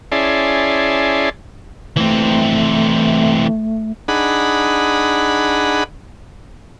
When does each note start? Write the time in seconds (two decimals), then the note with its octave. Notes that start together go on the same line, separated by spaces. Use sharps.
0.12 C#4 E4 G#4 D5 A5 C6
1.97 E3 A3 C4
4.08 D4 D#4 G#4 F#5 B5